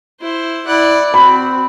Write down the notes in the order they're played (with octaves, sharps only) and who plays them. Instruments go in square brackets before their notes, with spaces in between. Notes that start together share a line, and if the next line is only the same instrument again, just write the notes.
[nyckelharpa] E4 C5
[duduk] E4 [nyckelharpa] D5 F#5
[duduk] C4 [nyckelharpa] F#4 [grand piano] B5